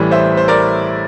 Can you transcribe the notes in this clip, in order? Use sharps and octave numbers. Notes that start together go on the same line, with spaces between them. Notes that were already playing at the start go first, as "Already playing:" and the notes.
Already playing: A1 A2 E3 G3
C5 E5
C5
A#4 D5